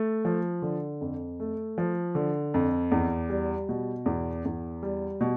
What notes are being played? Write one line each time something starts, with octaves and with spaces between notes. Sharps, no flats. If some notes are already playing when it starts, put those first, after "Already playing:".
Already playing: A3
F3
D3
F2
A3
F3
D3
F2
E2
G3
B2
E2
E2
G3
B2